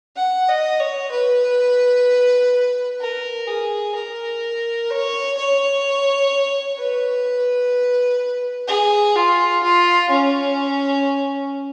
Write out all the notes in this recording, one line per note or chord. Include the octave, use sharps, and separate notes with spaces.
F#5
D#5
C#5
B4
A#4
G#4
A#4
C#5
C#5
B4
G#4
F4
F4
C#4